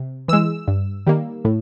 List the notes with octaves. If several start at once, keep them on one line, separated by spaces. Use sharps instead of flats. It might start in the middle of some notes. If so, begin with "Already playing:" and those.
Already playing: C3
E3 G#3 E6
G2
D#3 G3 A#3
A2